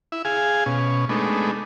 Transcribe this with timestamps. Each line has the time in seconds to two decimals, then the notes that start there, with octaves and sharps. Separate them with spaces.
0.12 E4 E5
0.25 G#4 F5 G#5
0.66 B2 C#4
1.09 G#3 A3 B3 D4 D#4